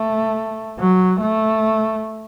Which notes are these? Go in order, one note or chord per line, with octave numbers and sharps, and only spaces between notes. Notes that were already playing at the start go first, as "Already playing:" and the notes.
Already playing: A3
F#3
A3